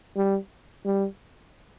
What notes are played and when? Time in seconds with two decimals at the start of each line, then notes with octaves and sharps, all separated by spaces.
0.17 G3
0.85 G3